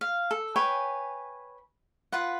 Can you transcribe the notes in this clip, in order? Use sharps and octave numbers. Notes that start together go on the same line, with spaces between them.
F5
A4
B4 C#5 G5 G#5
F4 B4 F#5